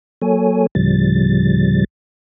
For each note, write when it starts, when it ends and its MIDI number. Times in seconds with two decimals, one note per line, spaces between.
0.22 0.67 54
0.22 0.67 58
0.22 0.67 69
0.22 0.67 73
0.22 0.67 80
0.75 1.84 38
0.75 1.84 45
0.75 1.84 49
0.75 1.84 53
0.75 1.84 55
0.75 1.84 93